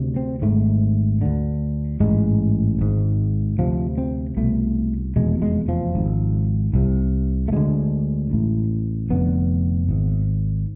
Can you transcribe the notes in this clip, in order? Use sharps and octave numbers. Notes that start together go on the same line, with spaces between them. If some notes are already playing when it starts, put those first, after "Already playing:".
Already playing: D2 C3
C4
G#1 G#2 A3
D2 D3
A1 G#2 G#3
G#1 G#2
D2 C3 F3
C4
C2 B2 A3
F1 E2 B2 G#3
G#3
F3
G#1 G#2
C2 C3
A3
D2 D3 G#3
A1 A2
F1 F2 D3 B3
G#1 G#2